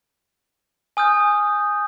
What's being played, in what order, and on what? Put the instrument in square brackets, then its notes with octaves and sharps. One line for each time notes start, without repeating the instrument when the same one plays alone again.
[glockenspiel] G#5 D#6 F6 G6